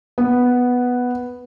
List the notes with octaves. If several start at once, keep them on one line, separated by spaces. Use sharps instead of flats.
B3